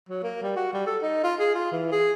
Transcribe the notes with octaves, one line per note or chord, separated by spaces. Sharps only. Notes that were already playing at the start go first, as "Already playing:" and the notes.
F#3
A#3
G3
F#4
G3
A4
D#4
F4
G#4
F4
E3
G#4